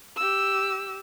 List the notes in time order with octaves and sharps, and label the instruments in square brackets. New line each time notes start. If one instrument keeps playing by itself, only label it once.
[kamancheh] G4 E6